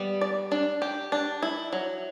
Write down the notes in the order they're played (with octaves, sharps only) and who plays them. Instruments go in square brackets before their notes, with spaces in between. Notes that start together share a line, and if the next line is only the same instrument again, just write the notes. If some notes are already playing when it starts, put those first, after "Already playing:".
Already playing: [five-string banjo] G3 B3
D5
D4
G4
D4
E4
F#3